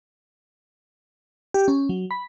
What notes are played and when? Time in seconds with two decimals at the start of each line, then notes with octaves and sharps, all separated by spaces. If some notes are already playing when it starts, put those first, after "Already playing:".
1.54 G4
1.68 C#4
1.89 F#3
2.11 B5